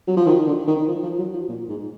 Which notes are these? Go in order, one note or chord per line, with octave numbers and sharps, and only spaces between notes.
F#3
F3
D#3
D3
D#3
F3
F3
F#3
F3
A#2
G#2